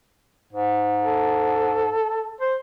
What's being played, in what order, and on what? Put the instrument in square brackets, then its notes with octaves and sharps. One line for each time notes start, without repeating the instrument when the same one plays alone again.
[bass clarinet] G#2
[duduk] A4
[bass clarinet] C5